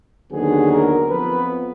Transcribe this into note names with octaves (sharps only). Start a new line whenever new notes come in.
D#2 D3 F#3 B3 G#4
A#4
F2 F3 B3 B4